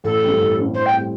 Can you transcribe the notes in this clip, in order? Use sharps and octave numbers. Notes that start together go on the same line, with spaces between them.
A1 A4
G2 G3 C4
A1
G2 G3 C4
A2 C5
G5
G3 C4